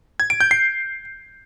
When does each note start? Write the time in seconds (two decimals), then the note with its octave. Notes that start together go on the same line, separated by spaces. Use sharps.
0.20 G#6
0.30 D7
0.41 G6
0.51 C7